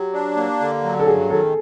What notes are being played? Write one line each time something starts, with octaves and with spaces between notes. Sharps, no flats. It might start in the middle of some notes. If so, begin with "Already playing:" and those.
Already playing: F#3 G4
D4
A#3
D3
F#3
A4
G2 G#4
D#3 A4